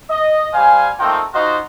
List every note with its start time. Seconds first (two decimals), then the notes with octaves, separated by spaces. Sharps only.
0.10 D#5
0.54 G3 C5 F5 G#5
1.00 A3 A#3 C4 D#4 F4 G5
1.33 D#4 F4 F#4 C5 D#5